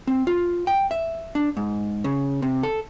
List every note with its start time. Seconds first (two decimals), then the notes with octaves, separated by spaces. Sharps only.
0.07 C4
0.27 F4
0.67 G5
0.91 E5
1.35 D4
1.57 G#2
2.04 C#3
2.42 C3
2.63 A4